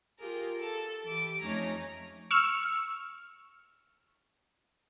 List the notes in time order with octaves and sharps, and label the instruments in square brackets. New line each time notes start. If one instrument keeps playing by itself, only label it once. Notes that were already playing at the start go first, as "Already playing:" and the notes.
[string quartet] F4 G4 G#4 A#4
A4 A5
E3 G4 D6
F2 A3 C#4 D#4 A#5 G#6
[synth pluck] C#6 E6 F6